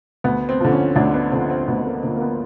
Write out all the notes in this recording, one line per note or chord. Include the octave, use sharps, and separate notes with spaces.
D2 B3
C4
D3 F3
C#4
D2 D4
B3
D3 F3 C4
C4
D2 B3
A#3
D3 F3 A#3
A#3
B3